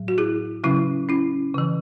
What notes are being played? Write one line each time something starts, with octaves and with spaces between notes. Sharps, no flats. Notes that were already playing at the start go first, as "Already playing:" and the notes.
Already playing: A2 F#3
F#4
E4 G#4
C#3 F#3 C#4 E4
C#4 E4
C#3 E3